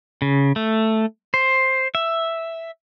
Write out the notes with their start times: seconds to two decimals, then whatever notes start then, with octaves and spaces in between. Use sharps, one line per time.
0.22 C#3
0.56 A3
1.34 C5
1.95 E5